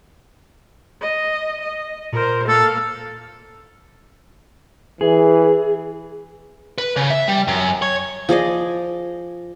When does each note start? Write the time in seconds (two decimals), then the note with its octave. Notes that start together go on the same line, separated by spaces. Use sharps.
1.01 D#5
1.61 D#5
2.12 A#2 A#4 C5
2.48 A#3 A4 F5
5.01 E3 G#4
6.78 B4
6.96 C#3
7.10 E5
7.28 G3
7.48 F#2
7.82 C#5
8.29 F3 G#4 D5 D#5